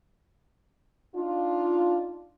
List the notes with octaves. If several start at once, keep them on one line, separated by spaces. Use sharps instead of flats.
D4 D#4 F4